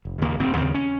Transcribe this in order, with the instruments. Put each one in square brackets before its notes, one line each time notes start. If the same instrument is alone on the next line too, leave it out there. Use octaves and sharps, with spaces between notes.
[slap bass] F1
D#2 C#3 A#3
F1 C4
D#2 C#3 C4
C#4